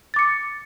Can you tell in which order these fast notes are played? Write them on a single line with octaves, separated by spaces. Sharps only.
A6 D6 C#7